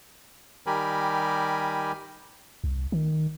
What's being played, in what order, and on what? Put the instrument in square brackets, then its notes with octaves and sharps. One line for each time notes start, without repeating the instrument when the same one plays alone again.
[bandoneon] D#3 G3 G4 A#4 G#5 B5
[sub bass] C2
D#3